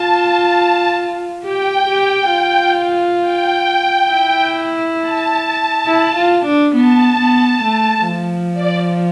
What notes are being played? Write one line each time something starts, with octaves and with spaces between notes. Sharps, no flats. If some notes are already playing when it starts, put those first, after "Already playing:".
Already playing: F4 A5
G4 G5
G4
F4
G5
E4
A5
E4
F4
D4
B3 A5
B3
A3
F3
D5